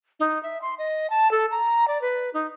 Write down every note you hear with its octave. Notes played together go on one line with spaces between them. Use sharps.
D#4
E5
C6
D#5
A5
A4
A#5
D5
B4
D#4